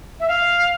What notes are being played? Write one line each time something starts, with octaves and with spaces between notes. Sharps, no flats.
E5
F5